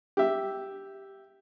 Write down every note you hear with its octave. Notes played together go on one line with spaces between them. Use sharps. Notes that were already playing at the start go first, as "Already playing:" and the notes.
G4 E5